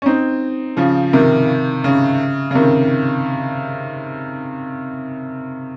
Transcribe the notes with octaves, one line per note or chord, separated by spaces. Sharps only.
C#4
C4 D#4
C#3 F3
C3 D#3
C#3
C#3
C3 D#3